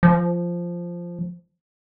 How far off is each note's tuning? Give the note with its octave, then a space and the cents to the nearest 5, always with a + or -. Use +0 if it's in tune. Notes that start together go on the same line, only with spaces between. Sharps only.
F3 -5